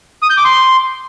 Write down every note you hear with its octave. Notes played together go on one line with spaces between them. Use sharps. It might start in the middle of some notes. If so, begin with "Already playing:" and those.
D#6
G6
D6
C6